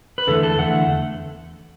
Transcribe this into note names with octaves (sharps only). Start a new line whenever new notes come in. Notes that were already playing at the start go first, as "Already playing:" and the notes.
B4
E2 D3 A3 A4
A4
E2 D3 A3 F#5